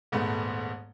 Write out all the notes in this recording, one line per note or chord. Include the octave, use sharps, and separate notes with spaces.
D#1 G#2 A3 B3